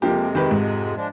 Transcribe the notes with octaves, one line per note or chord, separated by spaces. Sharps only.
F2 C3 F3 G#3 A#3 G4
D#3 G4 B4
G#2
F3 G#3 D4